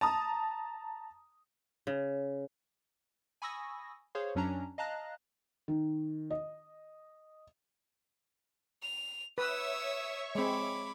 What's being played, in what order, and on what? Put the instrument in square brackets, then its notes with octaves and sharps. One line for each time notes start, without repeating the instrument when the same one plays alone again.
[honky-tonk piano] A5 A#5 D#6
[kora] C#3
[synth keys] G#5 B5 C#6 D#6 E6 A#6
G#4 C5 C#5 F5 C6
F#2 F#3 C#4 D4 A#5
D#5 F5 A5 A#5 F#6 A#6
[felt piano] D#3
D#5
[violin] F7
[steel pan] B4 [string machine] C#5 E5 C#6 [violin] D#6 E6
[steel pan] G#3 C4 [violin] B5 D6